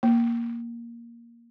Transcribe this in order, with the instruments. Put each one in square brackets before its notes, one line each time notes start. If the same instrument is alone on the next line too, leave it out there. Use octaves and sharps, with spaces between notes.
[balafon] A#3